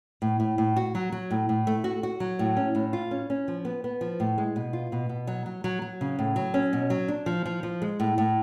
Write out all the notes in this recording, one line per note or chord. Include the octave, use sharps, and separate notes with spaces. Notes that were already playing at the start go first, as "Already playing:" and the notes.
A2
A2
A2
F#4
F#3
F#3
A2
A2
A3
F#4
F#4
F#3
A2
C#4
A2
F4
C#4
C#4
F3
B3
B3
F3
A2
G#3
B2
F4
B2
B2
F#3
F#3
F#3
F#3
C#3
A2
F#3
C#4
B2
F#3
D4
F3
F3
F3
G#3
A2
A2